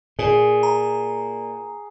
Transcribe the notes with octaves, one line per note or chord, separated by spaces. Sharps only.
A#2 G#4
A#5